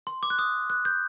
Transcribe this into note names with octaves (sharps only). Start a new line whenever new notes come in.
C6
D6
F#6
D#6
F#6
G6